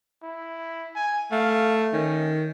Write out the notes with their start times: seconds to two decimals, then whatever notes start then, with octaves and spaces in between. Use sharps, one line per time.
0.23 E4
0.95 G#5
1.32 A3 F5
1.93 D#3 C#4